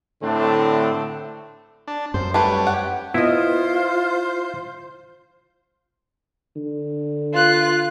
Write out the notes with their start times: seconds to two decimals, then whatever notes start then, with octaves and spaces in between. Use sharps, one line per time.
0.22 A2 D3 A3 C4 D4
1.88 D4
2.14 F#2 C5
2.34 G3 A3 G4 B4 C#5
2.67 F#5
3.14 B3 E4 F4 C5 D#5
6.56 D3
7.33 F4 F#6